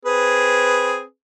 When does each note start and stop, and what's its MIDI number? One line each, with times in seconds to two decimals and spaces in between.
0.05 1.02 60
0.05 1.02 68
0.05 1.02 71